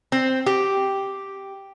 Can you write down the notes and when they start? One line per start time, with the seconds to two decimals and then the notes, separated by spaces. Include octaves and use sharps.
0.12 C4
0.46 G4